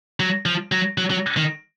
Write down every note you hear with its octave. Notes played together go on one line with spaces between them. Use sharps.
F#3
F3
F#3
F#3
F#3
D#3